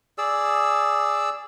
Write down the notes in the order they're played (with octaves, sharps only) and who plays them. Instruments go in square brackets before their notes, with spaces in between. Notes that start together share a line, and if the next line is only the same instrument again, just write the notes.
[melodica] G#4 D5 E6